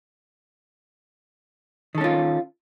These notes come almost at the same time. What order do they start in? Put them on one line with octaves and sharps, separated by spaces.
D#3 A4 C#4 F4